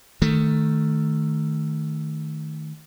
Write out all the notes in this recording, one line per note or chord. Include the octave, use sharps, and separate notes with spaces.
D#3 A3